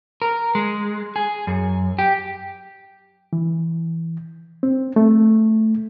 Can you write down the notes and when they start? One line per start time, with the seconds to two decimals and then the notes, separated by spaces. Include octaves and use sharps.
0.22 A#4
0.55 G#3
1.16 G#4
1.47 F#2
1.99 G4
3.33 E3
4.63 C4
4.96 A3